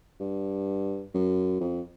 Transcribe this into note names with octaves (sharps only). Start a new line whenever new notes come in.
G2
F#2
F2